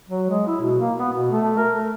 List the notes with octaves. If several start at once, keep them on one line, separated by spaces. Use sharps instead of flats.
F#3
G#3
E4
B2
A#3
B3
B2
A3
A#4
A3